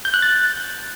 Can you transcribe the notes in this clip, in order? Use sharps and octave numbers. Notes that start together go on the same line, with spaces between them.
G6
F#6
A6